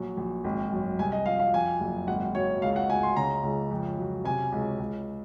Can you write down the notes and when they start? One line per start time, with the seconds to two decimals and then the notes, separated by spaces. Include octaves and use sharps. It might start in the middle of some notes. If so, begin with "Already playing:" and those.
Already playing: A#1 F#3
0.17 A#1
0.44 G#1
0.72 F#2
0.99 C2 G#5
1.12 D#5
1.26 F3 F5
1.39 F5
1.54 F2 G#5
1.80 F#1
2.07 G#1 F#5
2.35 F#3 C#5
2.62 C#2 F5
2.76 F#5
2.89 C#2 G#5
3.03 C6
3.16 C#3 A#5
3.43 C#2
3.71 F2
3.98 F#3
4.24 C3 G#5
4.52 C#2
4.79 C#2